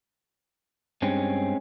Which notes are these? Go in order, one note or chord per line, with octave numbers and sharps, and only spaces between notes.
G2 G#3 C4 C#4